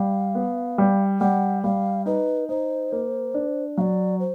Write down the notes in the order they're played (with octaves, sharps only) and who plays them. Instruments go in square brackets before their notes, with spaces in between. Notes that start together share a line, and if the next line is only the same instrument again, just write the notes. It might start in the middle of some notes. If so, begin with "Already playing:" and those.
Already playing: [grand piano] G3 [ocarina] F5
[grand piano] B3
G3
[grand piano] G3 [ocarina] F#5
[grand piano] G3 [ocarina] F5
[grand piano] D#4 [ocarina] B4
[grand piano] D#4 [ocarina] C5
[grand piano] A#3
D4
[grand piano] F#3 [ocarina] D5 F5
[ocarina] C5